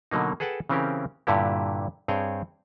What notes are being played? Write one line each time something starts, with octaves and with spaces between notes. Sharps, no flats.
B2 D3 F#3 A#3 D#4
G#4 A4 B4 F#5 G5 A5
C#3 E3 C4 C#4 G4 A#4
G2 A#2 D3 E4 G4
G2 C4 G#4 C#5 G5